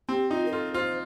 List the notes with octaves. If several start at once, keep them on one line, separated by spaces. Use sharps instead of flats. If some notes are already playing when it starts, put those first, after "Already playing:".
C4 G4
D#4 F4
A#4
F4 A4
F4 C5